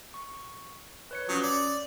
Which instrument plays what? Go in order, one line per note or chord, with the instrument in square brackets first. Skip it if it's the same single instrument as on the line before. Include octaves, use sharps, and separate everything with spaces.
[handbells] C#6
B4 C#5 C#7
[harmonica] F3 F#3 [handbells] C#4 D#6
[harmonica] D5